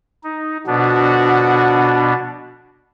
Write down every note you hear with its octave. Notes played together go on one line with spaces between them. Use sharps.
D#4
B2 D3 F3 B3 D4 F#4